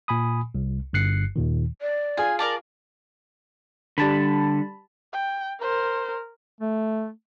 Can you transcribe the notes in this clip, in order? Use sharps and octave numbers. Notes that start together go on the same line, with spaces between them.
A#2 G#5 B5 D#6
C2
G1 G2 F#6 C7 C#7
D#2 A#2 D#3
D5
F4 G#4 G#5
A#4 D5 A5
D3 G3 A5 B5
G5
A#4 C5
A3